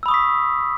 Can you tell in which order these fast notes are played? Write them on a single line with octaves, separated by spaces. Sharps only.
E6 B5 D#6 C#6 B6